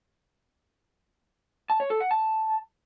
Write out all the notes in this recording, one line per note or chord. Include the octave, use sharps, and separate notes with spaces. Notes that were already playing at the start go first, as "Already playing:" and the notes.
A5
C#5
A4
F#5
A5